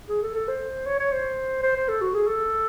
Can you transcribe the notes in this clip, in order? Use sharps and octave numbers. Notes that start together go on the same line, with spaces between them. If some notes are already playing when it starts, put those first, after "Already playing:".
G#4
A4
A4
C5
C#5
C#5
C5
C5
C5
A4
F#4
G#4
A4